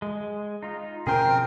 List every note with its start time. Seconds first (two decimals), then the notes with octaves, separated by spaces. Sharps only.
0.02 G#3
0.63 D#4 F4
1.07 B2 C#4 G#4 A#4 C5 G5
1.25 F3 C4